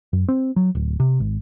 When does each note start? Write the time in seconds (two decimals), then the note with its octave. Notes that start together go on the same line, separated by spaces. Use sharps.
0.13 F#2
0.28 C4
0.56 F#3
0.75 D1
1.00 C3
1.20 G#1